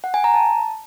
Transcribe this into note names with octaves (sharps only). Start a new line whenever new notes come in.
F#5
G#5
A#5
A5